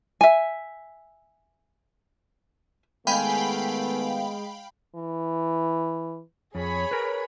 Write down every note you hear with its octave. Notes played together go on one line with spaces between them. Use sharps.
E5 G#5
D#3 G#3 A3 B3 F5 G5 G#5 B5
E3
F2 G#4 C#5 B5
A#4 B4